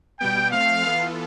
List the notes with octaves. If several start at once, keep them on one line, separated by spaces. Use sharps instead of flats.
B2 G3 B3 G5
F3 A3 C4 F5
E3 B3 F4 A4